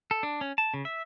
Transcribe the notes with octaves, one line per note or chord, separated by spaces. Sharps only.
A4
D4
C#4
A5
C#3
E5